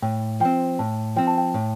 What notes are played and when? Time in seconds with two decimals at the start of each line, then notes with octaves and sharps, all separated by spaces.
0.02 A2 G5
0.40 F3 C4 G5
0.79 A2 A5
1.16 F3 C4 G5
1.27 A5
1.38 G5
1.54 A2